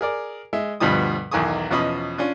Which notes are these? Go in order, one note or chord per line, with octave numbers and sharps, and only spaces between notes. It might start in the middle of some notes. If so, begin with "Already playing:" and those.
G#4 A#4 D5
G#3 E5
D2 G2 B2 F3 G3 D#6
B1 E2 D#3 G#5 C#6 D#6
E2 B2 F3 C#4 D#5 B5
C#4 D4 F4